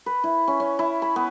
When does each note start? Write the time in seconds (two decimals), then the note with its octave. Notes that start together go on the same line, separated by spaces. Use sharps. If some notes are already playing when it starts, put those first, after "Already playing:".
0.06 B4
0.24 E4
0.47 C#4
0.60 C#4
0.79 E4
1.02 B5
1.16 B3